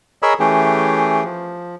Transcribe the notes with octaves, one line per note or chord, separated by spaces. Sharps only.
G#4 A#4 C#5 D#5 B5 E6
E3 A3 C#4 G4 G#4
F3